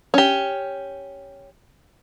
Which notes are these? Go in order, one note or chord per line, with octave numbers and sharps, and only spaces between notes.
C#4 G4